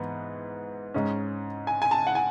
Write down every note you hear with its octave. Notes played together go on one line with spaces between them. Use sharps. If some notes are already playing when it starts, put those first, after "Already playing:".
Already playing: G#2 E3 B3
G#2 G#3 C#4
G#5
G#5
A5
F#5
G#5